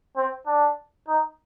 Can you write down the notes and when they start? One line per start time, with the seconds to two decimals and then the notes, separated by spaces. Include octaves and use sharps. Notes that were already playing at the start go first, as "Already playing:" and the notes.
0.17 C4
0.47 D4
1.08 D#4